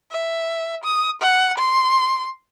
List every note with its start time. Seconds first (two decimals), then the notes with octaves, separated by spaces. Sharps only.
0.11 E5
0.84 D#6
1.22 F#5
1.58 C6